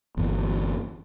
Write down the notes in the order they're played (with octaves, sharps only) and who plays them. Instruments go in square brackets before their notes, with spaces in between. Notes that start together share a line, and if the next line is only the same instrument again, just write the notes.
[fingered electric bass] G1 E2